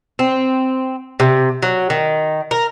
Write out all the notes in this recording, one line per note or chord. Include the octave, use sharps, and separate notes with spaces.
C4
C3
F#3
D#3
A#4